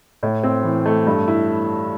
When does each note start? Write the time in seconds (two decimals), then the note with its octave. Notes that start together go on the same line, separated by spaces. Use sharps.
0.23 A2
0.43 C4
0.64 E3
0.86 A3
1.07 G2
1.28 E4